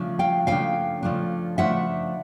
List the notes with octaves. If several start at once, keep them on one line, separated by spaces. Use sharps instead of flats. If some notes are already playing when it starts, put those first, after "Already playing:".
Already playing: C#3 F3 A3 D4
F5 G5
C#3 F3 A3 D4 F5 G5
C#3 F3 A3 D4
C#3 F3 A3 D4 E5 F#5